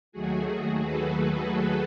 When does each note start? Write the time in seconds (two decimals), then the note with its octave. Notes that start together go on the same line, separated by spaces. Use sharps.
0.12 D#2 D#3 F#3 A3 F#4 G#4
0.82 A4 B4
1.51 A4 B4